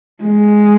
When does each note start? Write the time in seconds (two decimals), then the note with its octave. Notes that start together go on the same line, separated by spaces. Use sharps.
0.23 G#3